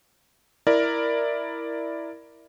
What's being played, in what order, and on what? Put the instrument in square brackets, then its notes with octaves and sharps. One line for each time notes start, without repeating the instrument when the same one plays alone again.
[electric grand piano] E4 A#4 D5